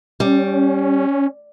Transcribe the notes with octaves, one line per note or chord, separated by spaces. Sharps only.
G3 C#4